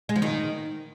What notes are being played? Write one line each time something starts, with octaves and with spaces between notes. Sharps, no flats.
G#3
F3
D#3